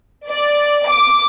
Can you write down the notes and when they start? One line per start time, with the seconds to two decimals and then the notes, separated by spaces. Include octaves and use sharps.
0.29 D5
0.89 D6